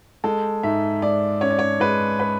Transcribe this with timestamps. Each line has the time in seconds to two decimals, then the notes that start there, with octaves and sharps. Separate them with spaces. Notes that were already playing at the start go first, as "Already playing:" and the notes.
0.24 G#3 A4
0.63 G#2 E5
1.02 G#2 D5
1.41 C#4 C#5
1.50 D5
1.59 C#5
1.80 G#3 B4
2.20 B4